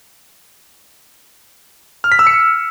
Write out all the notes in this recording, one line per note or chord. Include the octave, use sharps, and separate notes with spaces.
F6
B6
E6
C#7